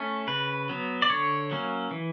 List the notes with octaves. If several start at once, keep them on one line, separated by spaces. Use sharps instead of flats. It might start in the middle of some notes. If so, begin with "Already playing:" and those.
Already playing: A3 C#4
C#3 B4
F#3 B3
D5
D3 C#5
F#3 A#3 C#4
E3